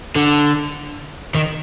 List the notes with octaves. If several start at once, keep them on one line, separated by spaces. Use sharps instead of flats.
D3
D#3